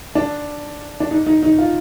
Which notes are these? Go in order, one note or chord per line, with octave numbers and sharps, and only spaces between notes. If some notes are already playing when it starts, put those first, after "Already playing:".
D4
D4
D#4
D#4
D#4
F4